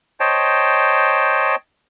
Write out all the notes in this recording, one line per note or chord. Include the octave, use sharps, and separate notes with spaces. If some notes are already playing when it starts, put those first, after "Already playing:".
C5 C#5 D#5 G5 A5